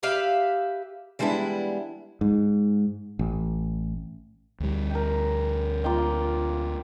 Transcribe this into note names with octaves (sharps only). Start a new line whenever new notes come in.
G4 B4 E5 F5
E3 G3 G#3 B3 D4 E4
G#2
A1
D2 G3
G4 A#4
A#3 F4 G5